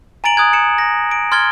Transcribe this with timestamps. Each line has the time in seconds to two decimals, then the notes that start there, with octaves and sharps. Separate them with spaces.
0.24 G#5 A#5 A6 D7 F#7
0.37 D#6 F#6 G#6
0.53 C#7 E7
0.78 A#6
1.11 D7
1.32 C6 F6 G#6 A6 G7